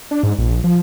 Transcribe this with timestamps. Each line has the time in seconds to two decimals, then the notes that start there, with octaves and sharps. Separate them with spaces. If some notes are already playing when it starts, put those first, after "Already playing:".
0.11 D4
0.23 G#2
0.38 A#1
0.64 F3